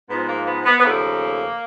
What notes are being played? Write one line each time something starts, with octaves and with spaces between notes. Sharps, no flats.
G#2 F3 G#3 B3
A#3
B3
B3
B3
D#2 C#3 F3 A3 A#3